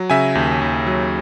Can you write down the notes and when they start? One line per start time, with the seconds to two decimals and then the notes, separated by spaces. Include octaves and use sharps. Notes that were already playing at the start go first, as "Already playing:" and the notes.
Already playing: F#3
0.10 C#3 E5 G#5
0.35 D#2
0.61 D#2
0.87 F#3